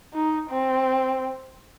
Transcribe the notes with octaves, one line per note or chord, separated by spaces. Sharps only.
D#4
C4